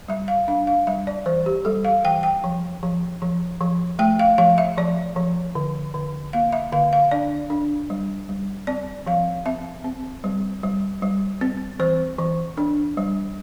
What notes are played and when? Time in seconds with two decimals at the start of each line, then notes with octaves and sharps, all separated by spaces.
0.08 G3 E5
0.28 F5
0.48 D4 F5
0.67 F5
0.87 G3 E5
1.07 D5
1.26 E3 C5
1.46 G4
1.65 G3 A4
1.85 F5
2.04 E3 G5
2.23 G5
2.44 F3
2.83 F3
3.22 F3
3.61 F3
3.99 A3 G5
4.19 F5
4.38 F3 F5
4.58 E5
4.78 F3 D5
5.16 F3
5.55 D3
5.94 D3
6.33 A#3 F5
6.52 E5
6.72 D3 F5
6.93 F5
7.11 D4 D5
7.50 D4
7.90 G3
8.29 G3
8.67 C4 D5
9.06 F3 F5
9.46 C4 E5
9.84 C4
10.24 G3
10.63 G3
11.02 G3
11.41 C4
11.80 E3 C5
12.19 E3
12.57 D4
12.97 G3